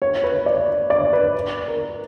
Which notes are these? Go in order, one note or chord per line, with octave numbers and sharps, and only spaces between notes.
C#5
B4
D5
D5
B4
A#4